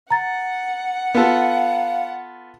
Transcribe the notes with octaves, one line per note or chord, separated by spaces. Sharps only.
F#5 A#5 A6
B3 F4 A4 F5